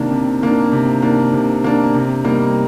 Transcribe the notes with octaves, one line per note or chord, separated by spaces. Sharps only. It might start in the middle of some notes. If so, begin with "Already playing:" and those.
Already playing: C3 D#3 A#3 D4
C3
D#3 A#3 D4
C3
D#3 A#3 D4
C3
D#3 A#3 D4
C3
G3 A#3 D#4